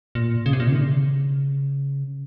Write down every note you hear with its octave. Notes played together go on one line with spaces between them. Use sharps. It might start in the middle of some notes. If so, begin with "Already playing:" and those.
A#2
C#3
C3
A#2
C3
D#3
C#3